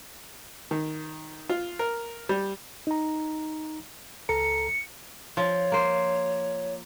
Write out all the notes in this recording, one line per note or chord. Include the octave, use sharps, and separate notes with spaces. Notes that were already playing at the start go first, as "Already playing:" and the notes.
D#3
F4
A#4
G3
D#4 A#5
C#2 A4 A#5 C#7
F3 C#5
A#3 C5